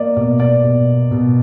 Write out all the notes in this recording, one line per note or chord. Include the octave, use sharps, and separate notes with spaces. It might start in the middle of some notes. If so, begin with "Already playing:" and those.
Already playing: A#3 D5 D#5
B2 D5
D5
B2
B2